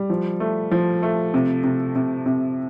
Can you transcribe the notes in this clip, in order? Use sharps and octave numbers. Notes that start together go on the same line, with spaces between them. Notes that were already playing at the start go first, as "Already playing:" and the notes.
Already playing: G3
F3
A3
F3
A3
C3
C3
C3
C3